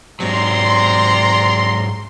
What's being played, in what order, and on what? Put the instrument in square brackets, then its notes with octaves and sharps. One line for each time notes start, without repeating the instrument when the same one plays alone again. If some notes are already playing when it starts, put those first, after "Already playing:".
[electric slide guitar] G#2 F#3 [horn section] C3 D5 A#5 [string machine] C6